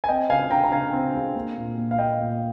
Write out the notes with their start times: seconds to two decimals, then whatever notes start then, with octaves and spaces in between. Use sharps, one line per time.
0.04 G#5
0.08 C4 D#5 G5
0.30 C#3 F5 G#5
0.51 C#3 G5 A#5
0.64 A#5
0.72 C#3 F5 G#5
0.93 C4
1.14 G#3
1.35 A#3
1.57 A#2
1.77 A#2
1.91 F5
1.98 A#3 D#5 G5
2.20 A#2